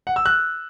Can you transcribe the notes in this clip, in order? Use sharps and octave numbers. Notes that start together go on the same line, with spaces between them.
F#5
E6
F#6